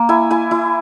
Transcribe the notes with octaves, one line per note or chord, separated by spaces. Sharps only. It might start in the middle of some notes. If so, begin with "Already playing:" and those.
Already playing: A#3
E4 G#5
E4 G#5
E4